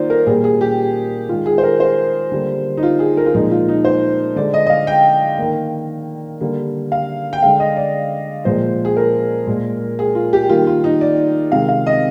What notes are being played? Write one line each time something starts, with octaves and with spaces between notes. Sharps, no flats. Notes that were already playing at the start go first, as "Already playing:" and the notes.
Already playing: D#3 A#3 D#4 F4 C5 D5
A#4
A#2 G3 A#3 G#4
G#4
G4
D#3 G#3 F4
G#4
C5
A#4
C5
D3 G3 A#3
D#4
F4
G#4
A#4
F4
A#2 F3 G#3 D#4
F4
D#4
C5
D3 G#3 D5
D#5
D#5
F5
G5
D#3 A#3
D3 G3 A#3
F5
G5
D3 G#3 F5
D#5
D5
A#2 F3 G#3 C5
G#4
A#4
A#2 G#3
G#4
F4
G4
D#3 G3 A#3 F4
F4
D#4
D5
C3 D#3 G#3 F5
F5
D#5